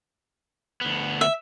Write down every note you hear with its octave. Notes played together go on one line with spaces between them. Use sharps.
D2 B3
E5